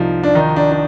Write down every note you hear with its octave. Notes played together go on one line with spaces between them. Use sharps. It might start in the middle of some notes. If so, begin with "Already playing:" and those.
Already playing: C2 F3 D#4
D4
D#3 D#4
D4
D4